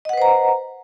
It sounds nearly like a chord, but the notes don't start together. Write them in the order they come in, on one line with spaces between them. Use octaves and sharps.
D#5 F#5 B4 C5 A#5